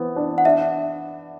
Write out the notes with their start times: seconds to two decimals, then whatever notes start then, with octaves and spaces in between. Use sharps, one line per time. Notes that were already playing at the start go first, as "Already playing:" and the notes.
Already playing: E3 B3 C4
0.16 D4
0.38 F#5
0.45 D4 E5